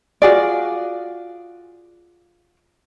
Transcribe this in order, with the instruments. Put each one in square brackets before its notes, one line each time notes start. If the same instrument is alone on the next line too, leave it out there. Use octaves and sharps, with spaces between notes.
[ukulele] F4 F#4 G#4 D5